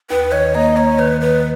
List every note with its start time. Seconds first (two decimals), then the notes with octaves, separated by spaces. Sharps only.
0.10 D#2 B4
0.32 D#3 C#5
0.55 A#3 D#5
0.76 A#3 C#5
0.99 D#3 B4
1.20 D#3 B4